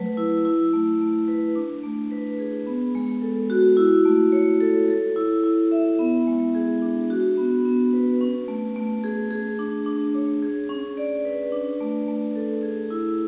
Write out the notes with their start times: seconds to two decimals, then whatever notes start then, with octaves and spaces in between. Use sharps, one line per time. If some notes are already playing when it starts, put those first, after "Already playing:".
Already playing: F#3 A3 B4
0.17 E4
0.45 E4
0.73 A3
1.01 A3
1.28 B4
1.55 D4
1.83 A3
2.11 B4
2.39 G#4
2.66 B3
2.95 G#3
3.22 A4
3.50 F#4
3.77 E4
4.05 A3
4.32 C#5
4.61 A4
4.88 A4
5.16 E4
5.44 E4
5.71 E5
5.99 B3
6.27 G#3
6.54 G#4
6.82 D4
7.10 F#4
7.37 B3
7.65 B3
7.93 B4
8.21 C#4
8.48 A3
8.76 A3
9.04 G#4
9.31 G#4
9.59 D4
9.86 D4
10.15 C#5
10.42 G#4
10.69 C#4
10.97 D5
11.25 B4
11.52 D4
11.80 A3
12.08 A3
12.35 A4
12.63 G#4
12.90 E4